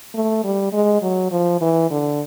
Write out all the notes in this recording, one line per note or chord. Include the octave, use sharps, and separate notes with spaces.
A3
G3
G#3
F#3
F3
E3
D3